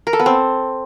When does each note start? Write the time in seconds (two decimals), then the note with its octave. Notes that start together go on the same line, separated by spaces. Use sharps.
0.07 A#4
0.13 A4
0.19 B3
0.26 C4